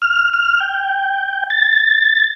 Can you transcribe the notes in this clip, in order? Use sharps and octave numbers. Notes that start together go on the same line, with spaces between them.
F6
F6
G5
A6